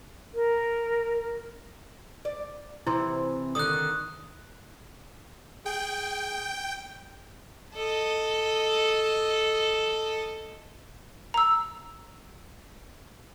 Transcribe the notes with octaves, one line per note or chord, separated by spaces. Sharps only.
A#4
D5
C3 E3 C4 E4 C5 C6
D3 D#3 D#6 F#6
G#4 G5
A4 D#5
A#5 E6